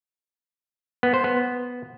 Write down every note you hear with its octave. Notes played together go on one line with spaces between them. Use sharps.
B3
C5
B3